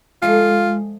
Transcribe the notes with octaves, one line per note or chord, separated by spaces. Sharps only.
F3 G#3 A3 F4 D#5